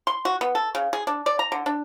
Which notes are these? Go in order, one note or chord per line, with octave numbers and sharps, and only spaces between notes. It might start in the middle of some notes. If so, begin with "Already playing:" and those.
C6
F#4
B3
A4
C#3
G#4
D4
D5
A#5
D3
D4